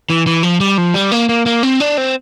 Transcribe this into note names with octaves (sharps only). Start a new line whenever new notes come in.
E3
E3
F3
G3
F3
G3
A#3
A#3
A#3
C4
D4
C4